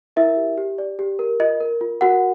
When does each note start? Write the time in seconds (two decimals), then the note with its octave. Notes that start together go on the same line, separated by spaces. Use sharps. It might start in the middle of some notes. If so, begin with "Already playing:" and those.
0.16 E4 A#4 E5
0.37 G4
0.58 G4
0.78 D5
0.99 G4
1.19 A#4
1.40 F4 D#5
1.60 A#4
1.81 F4
2.01 F#4 A#4 F#5